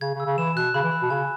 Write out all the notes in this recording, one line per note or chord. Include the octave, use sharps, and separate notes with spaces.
C#3 G#6
C#3
E6
C#3
E3 E7
B2 F#6
C#3 B5
E3
B5
B2
C#3 G#5